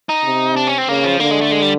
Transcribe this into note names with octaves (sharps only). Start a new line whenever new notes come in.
D#4
C3
D4
C#4
C4
C#3 A#3
F3
D3 A#3
G#3
A3
G#3
G3